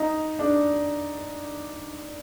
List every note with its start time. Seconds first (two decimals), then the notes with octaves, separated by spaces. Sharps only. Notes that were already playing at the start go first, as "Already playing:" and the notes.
Already playing: D#4
0.39 D4